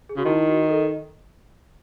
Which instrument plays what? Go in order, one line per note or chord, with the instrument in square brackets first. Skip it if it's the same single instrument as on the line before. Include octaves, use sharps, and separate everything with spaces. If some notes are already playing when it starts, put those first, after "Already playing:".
[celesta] G#4
[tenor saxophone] C#3 [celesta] F#4
[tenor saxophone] D#3 [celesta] E4
[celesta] F#4
A4
D#5